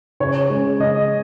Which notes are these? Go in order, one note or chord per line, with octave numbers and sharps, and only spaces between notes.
C#3 C#5
G#3 C#4
C#3 D#5